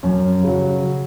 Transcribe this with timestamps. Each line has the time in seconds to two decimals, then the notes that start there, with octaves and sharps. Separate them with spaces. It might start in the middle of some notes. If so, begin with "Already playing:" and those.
0.03 F#2 C#4
0.43 C#3 F#3